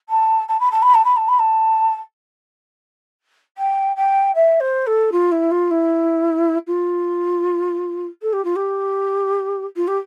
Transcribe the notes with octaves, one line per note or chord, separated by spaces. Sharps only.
A5
A5
B5
A5
B5
A5
B5
A5
B5
A5
G5
G5
E5
C5
A4
F4
E4
F4
E4
F4
A4
G4
F4
G4
F4
G4